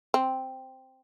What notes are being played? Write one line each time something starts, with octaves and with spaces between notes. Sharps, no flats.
C4